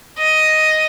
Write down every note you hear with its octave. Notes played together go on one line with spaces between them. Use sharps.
D#5